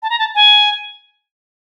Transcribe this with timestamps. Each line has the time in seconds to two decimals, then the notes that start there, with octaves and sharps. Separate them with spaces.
0.03 A5
0.10 A#5
0.19 A5
0.35 G#5